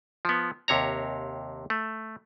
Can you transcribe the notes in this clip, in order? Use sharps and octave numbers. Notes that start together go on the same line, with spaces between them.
F3 B3
D#2 C3 C#5 A#5
A3